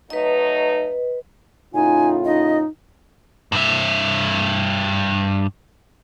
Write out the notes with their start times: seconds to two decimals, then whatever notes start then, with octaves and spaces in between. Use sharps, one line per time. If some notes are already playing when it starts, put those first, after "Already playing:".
0.10 F#3 A3 D#4 B4 D#5
1.74 A2 C#3 D#4 F4 G#5
2.25 D#4 D#5
3.52 G2 E5